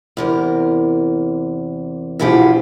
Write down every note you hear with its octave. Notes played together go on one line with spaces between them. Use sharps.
E2 C3 A#4
E2 G2 B2 F3 G4 G#4